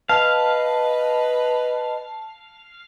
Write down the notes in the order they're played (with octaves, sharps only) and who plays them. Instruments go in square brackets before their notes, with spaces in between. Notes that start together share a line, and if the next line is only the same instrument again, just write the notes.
[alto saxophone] B4 [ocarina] D#5 [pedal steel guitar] F5 [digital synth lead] A5